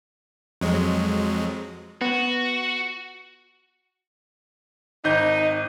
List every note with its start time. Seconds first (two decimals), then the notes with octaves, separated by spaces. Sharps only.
0.61 F2 F#3 G#3
2.01 B3 F#4
5.04 G#1 D#4 G6